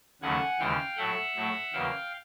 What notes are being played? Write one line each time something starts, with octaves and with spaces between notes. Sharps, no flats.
D#2 C#3 F#3 A3 F#5 G#5
D#2 C#3 E3 G#3 F5 G5
A2 F#3 A3 E5 F#5
A2 F#3 A3
E2 C#3 F#3 A#3 F5 G5